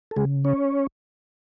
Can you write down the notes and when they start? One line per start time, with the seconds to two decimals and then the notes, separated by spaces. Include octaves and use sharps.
0.11 A4
0.16 C#3 G#3 G#4
0.45 C#4 C#5